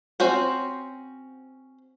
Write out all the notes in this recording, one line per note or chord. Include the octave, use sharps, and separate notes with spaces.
C4 C#4 F#4 C5